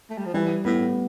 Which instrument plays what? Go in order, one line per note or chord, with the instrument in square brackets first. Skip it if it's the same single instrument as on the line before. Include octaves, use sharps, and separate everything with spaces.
[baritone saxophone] A3
G3
F3
[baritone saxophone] E3 [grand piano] G3
[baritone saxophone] A2 [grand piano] B3